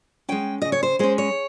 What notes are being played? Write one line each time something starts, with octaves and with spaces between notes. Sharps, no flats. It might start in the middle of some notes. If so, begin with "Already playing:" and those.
G#3 C#4 G5
C#3 D#5
C#5
C5
G#3 C#4 C5
C#5